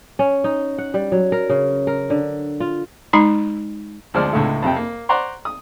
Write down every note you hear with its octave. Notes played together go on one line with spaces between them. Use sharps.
C#4
D#4
F#5
G3
F#3
A#4
C#3
A#4
D3
F4
G#3 D#4 B5 C6
D2 F3 G#3 C5 D5 F6
C#2 A2 D3 G#3 A3
F2 C3 G5
A#3
C5 D5 F#5 A#5 C6 C#6
D#6